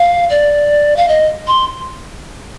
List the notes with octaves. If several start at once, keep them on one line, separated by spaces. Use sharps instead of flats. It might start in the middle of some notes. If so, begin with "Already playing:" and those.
Already playing: F5
D5
F5
D#5
C6